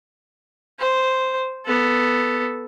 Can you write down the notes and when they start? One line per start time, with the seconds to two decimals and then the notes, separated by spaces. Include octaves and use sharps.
0.79 C5
1.66 B3 A4